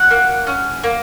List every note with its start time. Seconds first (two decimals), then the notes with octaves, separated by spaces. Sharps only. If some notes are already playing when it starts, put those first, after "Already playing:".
Already playing: F#4 F#5
0.11 A#3
0.47 C#4
0.84 A#3